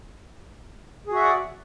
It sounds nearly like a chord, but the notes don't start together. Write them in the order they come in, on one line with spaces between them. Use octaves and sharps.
G#4 F#4 E5 F#5 D5